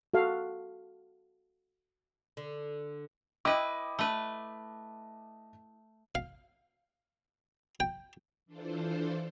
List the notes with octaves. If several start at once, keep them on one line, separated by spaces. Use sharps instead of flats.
F#4 A4 F5
D3
E4 B4 D#5 G5 D6
A3 B4
F5
G5
E3 D4 F4 A4 C5